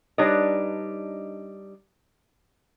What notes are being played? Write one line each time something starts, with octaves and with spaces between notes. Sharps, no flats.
G3 D4 D#4 B4 C#5 D#5